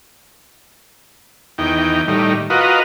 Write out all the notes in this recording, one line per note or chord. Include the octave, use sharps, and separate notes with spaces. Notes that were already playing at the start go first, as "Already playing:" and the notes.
E2 D#3 G5
A2 D#3 G3
F4 F#4 A#4 B4 D#5